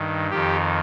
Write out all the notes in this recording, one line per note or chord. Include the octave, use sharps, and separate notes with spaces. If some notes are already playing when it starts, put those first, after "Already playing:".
Already playing: G2 D#3
F2 D#3 G4